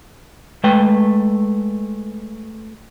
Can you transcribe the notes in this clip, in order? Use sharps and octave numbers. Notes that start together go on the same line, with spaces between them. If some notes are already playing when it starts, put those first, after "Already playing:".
G#3 A3 B4 G5